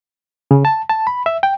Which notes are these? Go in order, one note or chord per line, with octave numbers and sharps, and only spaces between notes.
C#3
A5
A5
B5
E5
G5